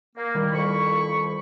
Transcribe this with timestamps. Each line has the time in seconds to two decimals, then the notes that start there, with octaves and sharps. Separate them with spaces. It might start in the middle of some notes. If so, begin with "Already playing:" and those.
0.16 A#3
0.35 D#3 G3 E4
0.53 F2 B5 C#6